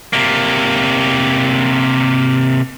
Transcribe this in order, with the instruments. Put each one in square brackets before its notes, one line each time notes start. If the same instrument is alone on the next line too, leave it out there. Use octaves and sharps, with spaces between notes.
[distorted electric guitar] C3 A#3